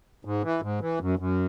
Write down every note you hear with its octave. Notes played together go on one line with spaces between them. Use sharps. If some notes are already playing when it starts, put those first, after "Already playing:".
G#2
E3
G#2
E3
F#2
F#2